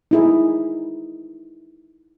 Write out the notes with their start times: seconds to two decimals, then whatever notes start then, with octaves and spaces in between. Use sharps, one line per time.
0.11 D#4 E4 G#4